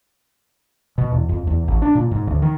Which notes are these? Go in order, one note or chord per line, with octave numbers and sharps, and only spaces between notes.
B2
E2
F2
E2
A1
D4
A#2
G#2
D2
D#3